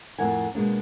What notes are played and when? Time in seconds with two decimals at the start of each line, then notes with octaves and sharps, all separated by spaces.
0.19 F2 A2 A#3 A#4 F#5 G#5
0.55 B2 G#3 A#3 D4